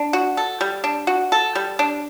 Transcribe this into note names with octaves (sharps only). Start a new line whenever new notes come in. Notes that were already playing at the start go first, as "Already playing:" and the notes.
Already playing: D4
F#4
A4
G3
D4
F#4
A4
G3
D4